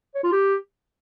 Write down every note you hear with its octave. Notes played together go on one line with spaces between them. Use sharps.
C#5
F4
G4